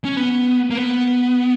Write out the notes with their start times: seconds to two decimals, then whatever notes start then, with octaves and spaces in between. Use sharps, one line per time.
0.05 C#4
0.17 B3
0.70 A#3
0.77 B3